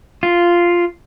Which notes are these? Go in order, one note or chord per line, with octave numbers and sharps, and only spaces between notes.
F4